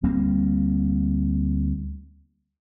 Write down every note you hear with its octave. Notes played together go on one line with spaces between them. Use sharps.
D2 G3 A#3 C4